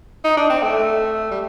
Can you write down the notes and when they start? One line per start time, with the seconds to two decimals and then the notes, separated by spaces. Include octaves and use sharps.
0.24 D#4
0.37 D4
0.50 C4
0.63 A3
1.31 G3